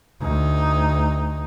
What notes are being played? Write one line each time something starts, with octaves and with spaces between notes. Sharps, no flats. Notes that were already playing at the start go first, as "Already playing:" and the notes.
D2 D#4